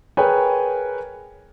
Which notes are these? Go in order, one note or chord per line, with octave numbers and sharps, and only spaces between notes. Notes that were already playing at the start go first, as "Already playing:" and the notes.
G#4 A#4 B4 C#5 G5 G#5